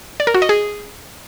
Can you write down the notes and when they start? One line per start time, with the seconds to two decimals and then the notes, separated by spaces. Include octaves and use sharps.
0.20 D5
0.27 A#4
0.34 F#4
0.42 D#5
0.49 G#4